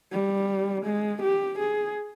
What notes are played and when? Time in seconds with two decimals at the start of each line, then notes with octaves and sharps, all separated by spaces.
0.12 G3
0.85 G#3
1.22 G4
1.58 G#4